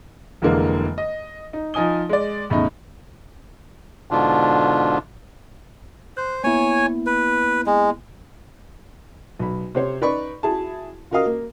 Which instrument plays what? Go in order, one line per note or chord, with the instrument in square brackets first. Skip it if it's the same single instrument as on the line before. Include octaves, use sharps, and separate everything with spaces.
[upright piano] F1 D3 E3 G#3 A#3
D#5
D#4
F3 D#4 G#5 D#6 G7
G#3 D5
E2 A2 C#3 D#4
[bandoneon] G#2 B2 D3 D4 F4
[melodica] C5 [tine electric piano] F#6
[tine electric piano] A#3 B3 E4 [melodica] C#5 G#5
[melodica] B4
G#3
[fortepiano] B1 B5
C3 C5 C#5
D#4 B4 D5 B5 C#6
E4 F#4 G#4 A5
F4 F#4 A#4 D#5 F5 D#6
A#3